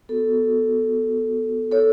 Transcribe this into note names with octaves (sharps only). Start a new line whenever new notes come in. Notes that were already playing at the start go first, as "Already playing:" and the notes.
B3 F#4 A4
A4 C#5